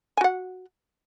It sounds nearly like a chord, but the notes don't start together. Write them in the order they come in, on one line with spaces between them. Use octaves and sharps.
G#5 F#4 F#5